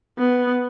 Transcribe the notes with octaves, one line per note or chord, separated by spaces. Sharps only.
B3